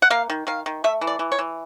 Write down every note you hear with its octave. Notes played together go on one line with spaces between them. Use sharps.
F#5
A#3 F5
D#3
D#3 F5
D#3
A3 E5
E3
D5
E3
C#5
E3